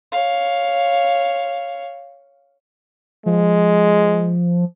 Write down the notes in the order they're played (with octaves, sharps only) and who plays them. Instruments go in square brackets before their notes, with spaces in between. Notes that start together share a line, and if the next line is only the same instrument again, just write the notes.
[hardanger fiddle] C#5 F5
[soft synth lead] F3 [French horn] G#3